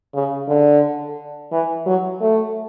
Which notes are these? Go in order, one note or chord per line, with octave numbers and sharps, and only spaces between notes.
C#3
D3
E3
F#3
A3